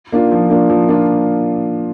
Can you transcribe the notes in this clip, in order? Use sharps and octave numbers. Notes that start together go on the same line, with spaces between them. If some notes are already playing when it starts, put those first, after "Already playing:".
A#3 D4 F4
F3
A#3 D4 F4
F3
A#3 D4 F4